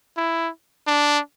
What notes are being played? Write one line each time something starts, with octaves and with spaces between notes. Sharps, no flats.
E4
D4